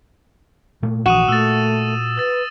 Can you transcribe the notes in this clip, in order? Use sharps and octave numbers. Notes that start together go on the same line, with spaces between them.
A#2 A3 A#3
A#1 E3 F#4 D#6 D#7 E7
A#2 A3 E6 A6
B4 E6 A6